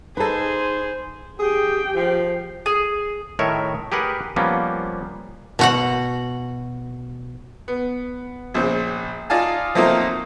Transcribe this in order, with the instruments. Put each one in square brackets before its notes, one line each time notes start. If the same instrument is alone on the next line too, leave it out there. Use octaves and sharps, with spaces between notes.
[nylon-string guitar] D#4 D#5 [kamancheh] G#4 [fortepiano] A4 B4 [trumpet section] C5
[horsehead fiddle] G4 G5 [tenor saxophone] G#4
[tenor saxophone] F3
[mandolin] G#4
[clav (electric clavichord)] A2 D#3 A#4 C#5 E5
G4 G#4 A#4 B4 F#5
F3 G3 A#3 B3 C#4
[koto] B2 F#4 F#5
[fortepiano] B3
A#1 A#2 C#3 C5
D#4 F4 D5 F5 G#5 A5
F3 F#3 A3 A#3 C4 D#4